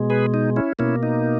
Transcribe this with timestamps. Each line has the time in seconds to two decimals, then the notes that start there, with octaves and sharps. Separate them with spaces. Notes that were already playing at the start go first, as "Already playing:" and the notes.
Already playing: B2 G#3
0.10 G#4 B4
0.34 D#4
0.56 C#4 E4
0.79 B2 A#3 C#4 E4
1.03 D#4